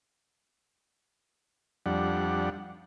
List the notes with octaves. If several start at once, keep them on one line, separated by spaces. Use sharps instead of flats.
F2 G3 D4 F#5